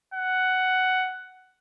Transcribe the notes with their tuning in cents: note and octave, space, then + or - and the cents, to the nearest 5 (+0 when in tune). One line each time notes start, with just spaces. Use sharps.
F#5 +10